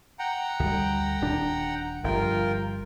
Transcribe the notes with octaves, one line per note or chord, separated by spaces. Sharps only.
F#5 G5 A#5
D2 G3
D#1 D4
G1 G2 F3 F4 A#4 G5